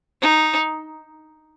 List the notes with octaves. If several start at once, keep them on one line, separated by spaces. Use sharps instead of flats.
D#4